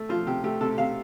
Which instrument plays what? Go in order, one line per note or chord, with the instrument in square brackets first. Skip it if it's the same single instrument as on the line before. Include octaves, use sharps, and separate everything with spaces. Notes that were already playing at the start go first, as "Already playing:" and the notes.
Already playing: [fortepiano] A3
F3 F4
C3 G4
A3 G4
C3 A4
C3 F5